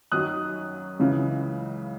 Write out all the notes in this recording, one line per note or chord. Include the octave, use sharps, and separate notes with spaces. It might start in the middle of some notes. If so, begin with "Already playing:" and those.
F#2 D#3 F#3 D#6 F#6
C#2 C#3 E3